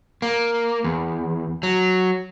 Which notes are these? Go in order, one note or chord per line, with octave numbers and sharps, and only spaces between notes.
A#3
E2
F#3